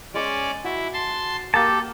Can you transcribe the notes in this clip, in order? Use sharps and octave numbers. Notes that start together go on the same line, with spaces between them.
G#3 C#4 D5 D6
E4 F#4
A5 C6
A#3 G4 A4 A5 D#6